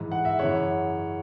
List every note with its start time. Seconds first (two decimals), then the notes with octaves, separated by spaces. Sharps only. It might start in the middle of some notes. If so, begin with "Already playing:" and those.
Already playing: G#2 E3
0.12 F#5
0.25 E5
0.39 F#2 C#3 E3 C#5 F#5